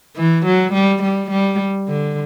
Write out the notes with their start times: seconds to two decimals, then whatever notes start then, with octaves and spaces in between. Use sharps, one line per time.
0.16 E3
0.46 F#3
0.73 G3
1.03 G3
1.31 G3
1.89 D3